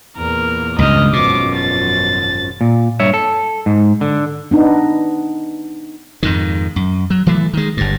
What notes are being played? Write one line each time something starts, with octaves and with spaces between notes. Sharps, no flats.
E2 A#2 A#3 A#4
C#2 G2 D#5 F6
G#1 F#2 B2 F3 D6
A6
A#2
G2 C#5 E5
A4
G#2
D3
B3 D4 D#4
F2 G#2 D#3
F#2
F#3
E3 F#3 A3
D#3 G#3
G1 G2